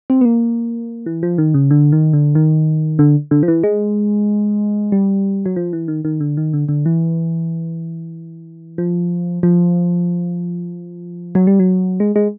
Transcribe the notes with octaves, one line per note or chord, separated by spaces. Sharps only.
C4
B3
A#3
E3
F3
D#3
C#3
D3
D#3
D3
D#3
D3
D3
F3
E3
G#3
G3
F#3
F3
E3
D#3
D#3
D3
D#3
D3
D3
E3
F3
F3
F#3
G3
F#3
G#3
G#3